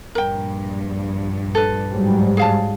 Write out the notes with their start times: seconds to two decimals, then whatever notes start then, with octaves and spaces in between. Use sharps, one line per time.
0.15 A#1 G2 A#4 G5
1.55 A4 B4
1.91 G#2 F#3 G3
2.37 G#4 F5 A5